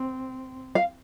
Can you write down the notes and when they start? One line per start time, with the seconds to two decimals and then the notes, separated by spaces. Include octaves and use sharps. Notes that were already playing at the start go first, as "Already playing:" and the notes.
Already playing: C4
0.75 F5